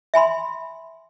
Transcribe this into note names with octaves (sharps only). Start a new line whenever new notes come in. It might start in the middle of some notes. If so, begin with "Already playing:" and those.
E5 G#5 B5 C6